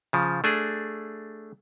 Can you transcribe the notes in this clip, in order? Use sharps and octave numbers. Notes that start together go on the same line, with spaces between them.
C#3 F3
A3 D4 G#4